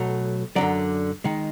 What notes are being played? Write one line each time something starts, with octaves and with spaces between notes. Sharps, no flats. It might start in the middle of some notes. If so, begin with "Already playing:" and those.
Already playing: B1 B2 F#3 A3
F#2 D3 F#3 D5
D#3 G#3